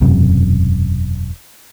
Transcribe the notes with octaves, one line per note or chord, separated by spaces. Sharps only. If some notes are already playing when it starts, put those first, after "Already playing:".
E1 F#2 C3